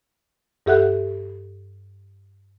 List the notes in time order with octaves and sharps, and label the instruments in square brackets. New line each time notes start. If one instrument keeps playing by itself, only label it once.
[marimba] G2 G4 A4 E5 F#5 F#6